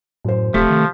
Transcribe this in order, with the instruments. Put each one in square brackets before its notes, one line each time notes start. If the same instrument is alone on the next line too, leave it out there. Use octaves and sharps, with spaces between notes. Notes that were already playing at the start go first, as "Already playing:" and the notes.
[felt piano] F#2 C5 [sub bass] A2
[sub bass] D#1 [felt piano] C3 G4 B6 [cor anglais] F3 [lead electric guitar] A3
[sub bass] D#3